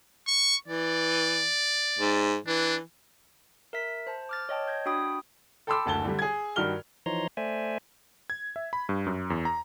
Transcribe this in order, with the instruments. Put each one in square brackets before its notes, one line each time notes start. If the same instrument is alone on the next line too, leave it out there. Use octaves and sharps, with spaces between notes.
[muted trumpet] C#6
[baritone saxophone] E3 [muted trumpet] D5
[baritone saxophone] G#2
[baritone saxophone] E3 [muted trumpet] D4
[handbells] A#4 E5 B6
C5 A5
D6 F6 A6
C#5 D#5 G5 A5
G6 G#6 A#6
D4 F#4 G5 B5 D#6
[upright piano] A4 G5 B5 C6 D6 E6
F#1 D2 A5 G7
D3 G3
G#4 G#6
G2 D#3 F#4 F6 G7
[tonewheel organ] E3 F3 D#4 C#5 A#5 C6
A3 C5 D5 E5 G#5
[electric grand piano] G#6
E5
B5
G2
F#2
E2
A#5